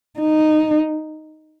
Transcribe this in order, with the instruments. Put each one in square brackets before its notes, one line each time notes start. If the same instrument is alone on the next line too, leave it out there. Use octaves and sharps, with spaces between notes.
[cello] D#4